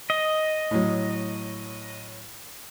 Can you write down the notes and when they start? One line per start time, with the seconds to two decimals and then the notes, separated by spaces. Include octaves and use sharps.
0.10 D#5
0.71 A2 F#3